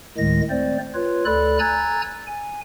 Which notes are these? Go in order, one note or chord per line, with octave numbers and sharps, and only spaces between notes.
D2 A2 D#3 G#3 A#6
A3 C4 C5 D5
F4 B4 C#5
D2 A4 D5 B5 F#6
G#5 A#5 E6 F#6 G#6 A6
G#5